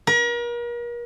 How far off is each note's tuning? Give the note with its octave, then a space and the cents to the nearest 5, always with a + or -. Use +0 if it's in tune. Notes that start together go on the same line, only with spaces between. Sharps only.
A#4 +40